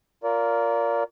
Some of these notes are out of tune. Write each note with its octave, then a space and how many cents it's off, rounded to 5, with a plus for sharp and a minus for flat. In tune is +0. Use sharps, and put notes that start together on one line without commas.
F4 +0 A#4 +0 D5 -30